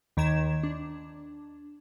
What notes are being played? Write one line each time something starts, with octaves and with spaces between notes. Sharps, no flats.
D#2 D#3 A#5 G#6 E7
D4